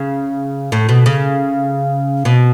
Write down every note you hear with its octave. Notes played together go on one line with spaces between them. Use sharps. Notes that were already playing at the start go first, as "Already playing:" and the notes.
Already playing: C#3
A2
B2
C#3
B2